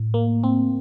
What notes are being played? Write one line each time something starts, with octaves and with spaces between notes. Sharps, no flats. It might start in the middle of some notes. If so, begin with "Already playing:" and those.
Already playing: A2
A#3
C4